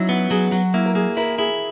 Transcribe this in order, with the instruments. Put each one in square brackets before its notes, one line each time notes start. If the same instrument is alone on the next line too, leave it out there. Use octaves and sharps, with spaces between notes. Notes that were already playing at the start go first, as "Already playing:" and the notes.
Already playing: [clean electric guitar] F#3 [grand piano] C#4 D#4 E4
[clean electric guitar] B3 [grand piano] F#4
[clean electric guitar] F#3 [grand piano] G#4
[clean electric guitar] F#3 [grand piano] F#4
[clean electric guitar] A#3 [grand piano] E4
[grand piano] A#4
[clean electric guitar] A#3 [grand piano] G#4
[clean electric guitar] E4 [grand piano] A#4
[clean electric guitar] E4 [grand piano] G#4